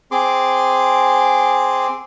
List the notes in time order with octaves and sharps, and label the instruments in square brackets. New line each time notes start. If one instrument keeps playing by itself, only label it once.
[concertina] C4 G#4 C6 D6